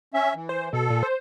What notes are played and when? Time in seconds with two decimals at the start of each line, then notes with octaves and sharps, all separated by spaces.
0.14 C#4 E5
0.35 E3
0.49 C5
0.73 B2 A4
0.90 A#2
1.03 C5